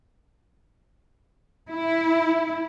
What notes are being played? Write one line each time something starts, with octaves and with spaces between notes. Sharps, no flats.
E4